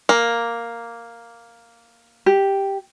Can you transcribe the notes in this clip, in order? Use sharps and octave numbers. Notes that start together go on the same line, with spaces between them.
A#3
G4